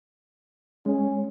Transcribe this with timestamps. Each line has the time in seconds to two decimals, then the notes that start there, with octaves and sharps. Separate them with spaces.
0.86 G#3 C#4